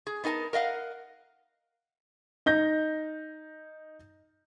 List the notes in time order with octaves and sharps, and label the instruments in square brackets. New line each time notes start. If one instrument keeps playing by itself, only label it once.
[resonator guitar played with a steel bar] G#4
B3 D#4 A#4 G#5 A5
A#4 D#5 F5 F#5
[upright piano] D#4 G6 A#6